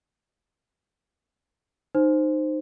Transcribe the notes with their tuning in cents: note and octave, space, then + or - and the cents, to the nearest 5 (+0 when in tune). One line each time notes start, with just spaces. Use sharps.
D#4 -20 C5 +0